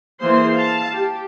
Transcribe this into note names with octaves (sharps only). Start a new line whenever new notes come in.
E3 A#3 G#4 C5 C6
F5 A5
G4